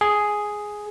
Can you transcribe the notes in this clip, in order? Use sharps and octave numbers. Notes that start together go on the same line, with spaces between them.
G#4